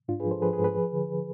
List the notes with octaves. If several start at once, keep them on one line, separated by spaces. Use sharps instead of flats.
G#2 D4 F4
G#4 B4
F3
A4 C5
F3 G#4 B4
G#4 B4
G#2
G#4 B4
F3
D3